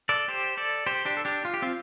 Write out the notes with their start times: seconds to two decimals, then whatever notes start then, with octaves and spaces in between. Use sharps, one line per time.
0.09 A4 D5
0.28 G4 C5
0.57 A4 D5
0.86 G4 C5
1.05 D4 G4
1.17 A4
1.25 D4 G4
1.45 F4
1.54 G4
1.62 C4 F4